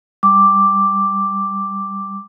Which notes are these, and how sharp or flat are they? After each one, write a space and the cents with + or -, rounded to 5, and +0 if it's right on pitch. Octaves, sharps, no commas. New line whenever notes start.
G3 +0 D6 +0